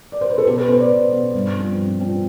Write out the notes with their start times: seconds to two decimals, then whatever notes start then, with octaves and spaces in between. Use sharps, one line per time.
0.12 D5
0.21 C5
0.30 B4
0.38 A4
0.47 B2 G4
0.58 B4
0.68 B3 C5
0.80 D5
0.90 B2
1.12 B3
1.34 G2
1.56 F3 C4
1.78 G2
2.00 F3 C4